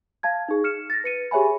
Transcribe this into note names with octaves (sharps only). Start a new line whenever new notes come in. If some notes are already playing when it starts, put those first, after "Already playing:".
F5 A5 G#6
D#4 G#4
F6 C#7 E7
A6 A#6
B4 C#7 D#7
G4 G#4 C#5 E5 G#5 B5